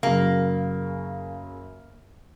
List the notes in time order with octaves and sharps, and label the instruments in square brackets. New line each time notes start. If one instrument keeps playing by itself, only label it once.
[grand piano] F#2 C#3 [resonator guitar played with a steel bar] A#3